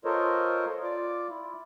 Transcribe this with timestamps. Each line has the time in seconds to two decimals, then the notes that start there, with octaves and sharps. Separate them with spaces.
0.05 F4 A4 A#4 C5 C#5 D#5
0.83 F4 D5 D6
1.30 E4